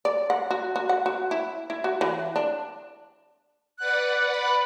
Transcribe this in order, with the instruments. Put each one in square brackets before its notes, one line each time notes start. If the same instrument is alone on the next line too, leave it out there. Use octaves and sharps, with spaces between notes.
[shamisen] D5
F#5
F#4
F#4
F#5
F#4
E4
E4
F#4
E3
D4
[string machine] B4 D5 F#5 [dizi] F#6
[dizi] B5